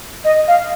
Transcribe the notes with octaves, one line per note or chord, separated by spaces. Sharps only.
D#5
F5